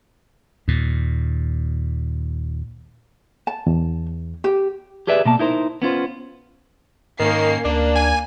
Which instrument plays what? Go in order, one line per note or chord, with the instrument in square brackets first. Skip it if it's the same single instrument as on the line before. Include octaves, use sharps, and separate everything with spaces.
[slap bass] D#2 A#2
[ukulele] A5
[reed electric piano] E2
[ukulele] G4
[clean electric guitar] G4 G#4 B4 D5 E5
B2 A#3 A5
D#4 E4 A#4 C5
B3 C#4 F4 C5
[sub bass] G#2 [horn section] D#3 [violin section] A#3 C#4 C7
[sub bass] D2 [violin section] A#3 [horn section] D4
[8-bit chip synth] G#5